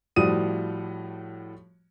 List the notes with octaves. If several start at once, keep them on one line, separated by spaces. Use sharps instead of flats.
A2 F3 G3 F#4 D#6 D#7